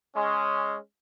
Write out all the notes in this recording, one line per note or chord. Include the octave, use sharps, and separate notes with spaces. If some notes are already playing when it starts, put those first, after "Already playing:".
G#3 C#4